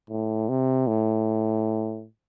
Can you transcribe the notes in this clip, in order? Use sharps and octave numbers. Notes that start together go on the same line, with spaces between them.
A2
C3
A2